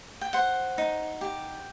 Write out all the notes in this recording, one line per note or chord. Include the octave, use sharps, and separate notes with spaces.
G5
C5 F#5
D#4
G4